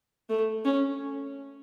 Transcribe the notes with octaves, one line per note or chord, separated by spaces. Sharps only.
A3
C#4